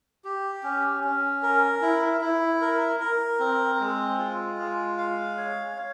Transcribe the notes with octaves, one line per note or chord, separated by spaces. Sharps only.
G4
C#4
C#4
A#4
E4
E4
A#4
A#4
C4
G#3
F4
G#3
F5
C#5
C#5